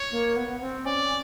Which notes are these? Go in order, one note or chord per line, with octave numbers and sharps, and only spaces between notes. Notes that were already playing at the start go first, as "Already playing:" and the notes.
Already playing: C#5
A#3
B3
B3
C4
C#4 D5